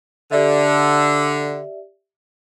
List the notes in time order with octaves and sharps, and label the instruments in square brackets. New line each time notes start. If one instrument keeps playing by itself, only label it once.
[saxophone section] D3 [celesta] G4 D5 E5